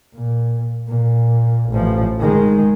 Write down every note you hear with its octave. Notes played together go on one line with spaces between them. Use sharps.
A#2
A#2
A1 F3
D#3 G#3